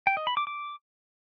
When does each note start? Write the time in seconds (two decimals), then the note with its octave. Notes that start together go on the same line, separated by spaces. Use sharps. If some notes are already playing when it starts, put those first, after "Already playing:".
0.07 G5
0.17 D#5
0.27 B5
0.37 D6
0.47 D6